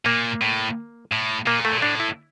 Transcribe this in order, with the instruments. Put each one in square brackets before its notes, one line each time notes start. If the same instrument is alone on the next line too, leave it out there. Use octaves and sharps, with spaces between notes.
[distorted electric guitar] A#2 [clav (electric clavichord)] A#3
[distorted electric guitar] A2
A2
[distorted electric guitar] A#2 [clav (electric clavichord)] A#3
[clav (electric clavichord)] A3
[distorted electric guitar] A#2
[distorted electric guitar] A2 [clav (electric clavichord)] D4
[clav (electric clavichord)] E4